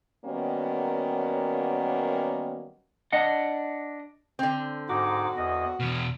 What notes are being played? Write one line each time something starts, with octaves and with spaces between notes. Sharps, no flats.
D#3 F#3 G3 A#3 B3 C#4
D4 D#5 F#5
D3 C4
G#2 D#4 F#4 D6
E2 D#5
E2 B2 F6